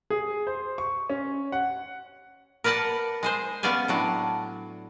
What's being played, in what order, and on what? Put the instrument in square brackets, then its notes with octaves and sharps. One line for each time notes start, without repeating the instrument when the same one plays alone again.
[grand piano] G#4
C5
C#6
C#4
F#5
[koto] A#4 B4 D5 F#5 A5
G#3 G#4 C5
B3 C#4 D5 F5 G#5
A2 F#3 D4